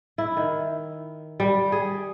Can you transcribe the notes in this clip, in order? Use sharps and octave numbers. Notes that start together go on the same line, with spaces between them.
E4
D#3
G3
G#4